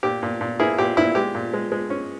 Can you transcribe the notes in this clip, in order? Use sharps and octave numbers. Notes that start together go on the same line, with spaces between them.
A#2 G4
A#2
A#2
A#3 E4 G#4
A#2 G4
A#2 E4
G#3 G4
A#2
G#3
G#3
C#4